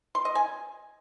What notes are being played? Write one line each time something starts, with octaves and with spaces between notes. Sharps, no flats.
C6
D#5
G#5